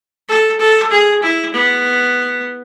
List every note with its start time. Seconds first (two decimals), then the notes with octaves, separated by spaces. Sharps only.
0.29 A4
0.60 A4
0.91 G#4
1.23 E4
1.54 B3